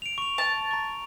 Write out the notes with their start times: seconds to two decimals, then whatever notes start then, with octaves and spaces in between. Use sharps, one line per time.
0.02 D7 F7
0.18 C#6 F7
0.38 A5
0.71 A#5 C#6